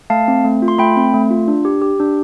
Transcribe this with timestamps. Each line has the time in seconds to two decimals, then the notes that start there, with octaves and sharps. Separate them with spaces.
0.10 A3 F5 A5
0.28 C4
0.45 A3
0.62 F4
0.68 C6
0.79 A3 G5 B5
0.97 C4
1.14 A3
1.30 F4
1.48 D4
1.65 G4
1.82 G4
2.00 D4